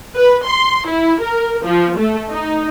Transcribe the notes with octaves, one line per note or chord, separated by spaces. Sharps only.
B4
C6
E4
A#4
F3
A3
D#4